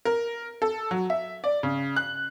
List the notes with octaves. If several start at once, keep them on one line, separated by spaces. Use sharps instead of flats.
A#4
A4
F#3
E5
D5
C#3
F#6